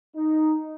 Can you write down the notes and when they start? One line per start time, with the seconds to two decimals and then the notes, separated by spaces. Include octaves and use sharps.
0.17 D#4